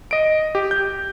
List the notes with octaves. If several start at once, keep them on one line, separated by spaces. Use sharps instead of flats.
D#5 D7
G4
G6